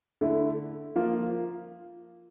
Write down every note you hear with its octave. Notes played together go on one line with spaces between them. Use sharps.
D3 A3 E4
F3 A#3 F4